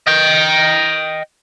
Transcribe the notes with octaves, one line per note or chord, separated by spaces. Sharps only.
D#5 G5